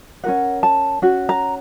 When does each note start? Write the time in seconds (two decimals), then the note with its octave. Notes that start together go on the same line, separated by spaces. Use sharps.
0.24 C#4 F#4 A#4 F#5
0.63 A5
1.02 C#4 F#4
1.29 A#5